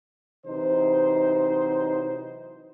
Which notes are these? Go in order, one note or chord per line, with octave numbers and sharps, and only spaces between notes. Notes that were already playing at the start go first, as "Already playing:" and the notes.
C3 E3 F#3 D#4 C5